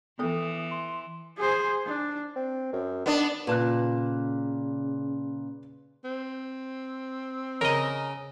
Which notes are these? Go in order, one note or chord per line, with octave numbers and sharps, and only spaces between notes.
E3 B3 A4 D#6
C6
G#4 C5
D4
C4
F#2
D#3 B3 D4
A#2 C#3 B4 A5 F#6
C4
C#3 A#4 D#5